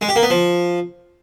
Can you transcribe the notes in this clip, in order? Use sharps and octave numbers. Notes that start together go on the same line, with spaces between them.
G#3
G4
A#3
B3
F3